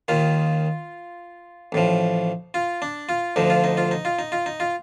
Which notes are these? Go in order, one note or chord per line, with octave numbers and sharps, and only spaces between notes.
D#2 D#3 F4
A1 A2 F3
F4
D4
F4
D2 D3 F3 D#4
F4
D#4
F4
D#4
F4
D#4
F4
D#4
F4